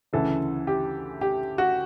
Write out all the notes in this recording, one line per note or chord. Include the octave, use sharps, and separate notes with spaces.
D2 C#3 E3 A4
G4
G4
F#4